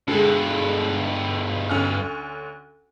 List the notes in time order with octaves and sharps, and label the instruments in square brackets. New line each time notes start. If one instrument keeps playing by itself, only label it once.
[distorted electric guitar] G2 B2 [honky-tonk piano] D3 G#3
[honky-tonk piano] D2 C#4 F6